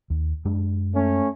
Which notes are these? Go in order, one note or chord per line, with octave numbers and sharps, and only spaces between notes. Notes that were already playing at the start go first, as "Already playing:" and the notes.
D#2
F#2 G#3 D4
A3 C#4